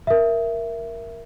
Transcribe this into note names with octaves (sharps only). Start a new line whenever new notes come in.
A#4 E5